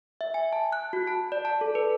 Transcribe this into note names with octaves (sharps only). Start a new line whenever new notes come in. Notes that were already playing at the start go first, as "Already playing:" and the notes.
E5
G#5
A5
F#6
F#4
A5
D5
A5
A4
B4